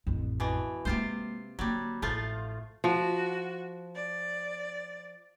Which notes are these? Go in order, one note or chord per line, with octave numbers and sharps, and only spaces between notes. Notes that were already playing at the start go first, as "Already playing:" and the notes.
A1 F2
B2 E3
C3 G#3 A#3 F4 C5
D3 F#3 G3 A#3
A1 F3 A3 F4
F3 F#4
D5